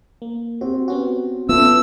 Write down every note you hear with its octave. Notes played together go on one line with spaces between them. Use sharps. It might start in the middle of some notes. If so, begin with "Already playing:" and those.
A#3
C4 F#4 G4
B3 C#4 F#4
B3 C#4 F4 A4 E5 E6